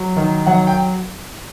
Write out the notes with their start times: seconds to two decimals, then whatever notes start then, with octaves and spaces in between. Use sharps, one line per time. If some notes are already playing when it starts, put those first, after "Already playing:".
Already playing: F#3
0.16 D#3
0.46 F#3 F#5
0.67 G5